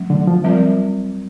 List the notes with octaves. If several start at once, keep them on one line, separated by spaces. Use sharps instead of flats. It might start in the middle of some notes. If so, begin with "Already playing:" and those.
Already playing: F#3 A3 C#4
D3
F3
G3 C4 F4 A#4 D5